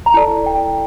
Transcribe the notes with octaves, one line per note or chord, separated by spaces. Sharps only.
A#5
E4 A4 D5 A5
G5